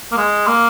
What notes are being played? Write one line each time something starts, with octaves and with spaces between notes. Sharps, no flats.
A#3
G#3
A#3